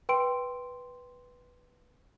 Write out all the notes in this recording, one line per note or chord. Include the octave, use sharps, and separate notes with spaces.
B4 G5 C6 D7